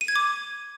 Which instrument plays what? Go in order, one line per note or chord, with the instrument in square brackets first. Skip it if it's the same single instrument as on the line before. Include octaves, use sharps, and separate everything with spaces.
[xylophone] D#7
G#6
D6